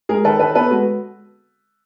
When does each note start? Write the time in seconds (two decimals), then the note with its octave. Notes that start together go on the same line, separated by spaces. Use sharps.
0.09 G#3 G#4 A#4
0.25 D#3 A4 B4
0.39 D#3 A4 B4
0.55 B3 A4 B4
0.71 G#3 F#4